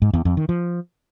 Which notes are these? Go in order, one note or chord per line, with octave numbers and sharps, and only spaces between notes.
G#2
E2
F2
D#3
F3